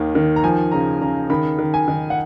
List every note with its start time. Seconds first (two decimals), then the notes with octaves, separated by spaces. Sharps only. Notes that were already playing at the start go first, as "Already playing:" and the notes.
Already playing: D#2 D#3
0.15 D#3
0.36 A#5
0.43 F3 G#5
0.72 C#3 A#5
1.01 C#3 A#5
1.30 D#3 B5
1.59 D#3
1.74 G#5
1.88 D#3
2.10 F#5